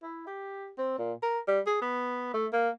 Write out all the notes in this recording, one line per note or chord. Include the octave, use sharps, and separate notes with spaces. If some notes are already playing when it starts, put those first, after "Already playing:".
E4
G4
C4
A#2
A#4
G3
G#4
B3
A3
A#3